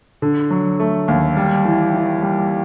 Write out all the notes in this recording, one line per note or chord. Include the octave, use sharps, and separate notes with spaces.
D3
F#3
A3
D#2
G3
E3
E3
G3